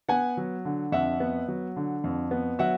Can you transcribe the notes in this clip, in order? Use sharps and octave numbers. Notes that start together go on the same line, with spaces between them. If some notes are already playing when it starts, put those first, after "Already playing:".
B3 F#5 G#5
F#3
D3
F2 E5 F#5
B3
F#3
D3
F2
B3
F#3 E5 F#5